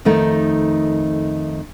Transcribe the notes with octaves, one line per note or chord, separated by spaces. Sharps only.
F2 D#3 A3 D#4